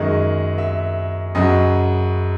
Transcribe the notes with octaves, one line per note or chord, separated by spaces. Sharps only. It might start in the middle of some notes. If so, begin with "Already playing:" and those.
Already playing: F#2 D#3 G#3 D#5
E5
F#2 C#3 F#3 D#5